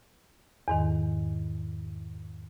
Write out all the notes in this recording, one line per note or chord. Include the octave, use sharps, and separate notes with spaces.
E2 G#2 D#3